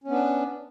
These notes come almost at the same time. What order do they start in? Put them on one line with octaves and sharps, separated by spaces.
C#4 B3 D4